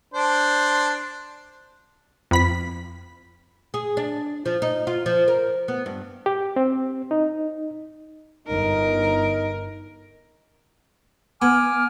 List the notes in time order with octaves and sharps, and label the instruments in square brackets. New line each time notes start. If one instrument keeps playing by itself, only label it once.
[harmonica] D4 C5
[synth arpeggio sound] F2 B5 B6
[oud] G#4
D4
F3
D#4
F4
F3
A#4
B3
G2
[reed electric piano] G4
C4
D#4
[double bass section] G1 [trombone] D#4 [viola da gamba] A#4
[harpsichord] B3 [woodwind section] G#5 D6 F6